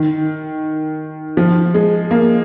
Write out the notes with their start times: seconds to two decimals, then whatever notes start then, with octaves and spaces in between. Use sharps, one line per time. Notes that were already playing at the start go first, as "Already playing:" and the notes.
Already playing: D#3
1.37 F3
1.74 G#3
2.11 A#3